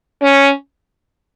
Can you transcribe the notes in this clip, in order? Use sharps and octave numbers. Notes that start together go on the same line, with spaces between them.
C#4